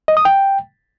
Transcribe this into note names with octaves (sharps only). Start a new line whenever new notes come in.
D#5
D#6
G5